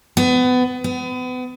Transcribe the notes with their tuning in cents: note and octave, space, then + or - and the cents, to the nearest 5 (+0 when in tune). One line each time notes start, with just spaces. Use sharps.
B3 +25
B3 +35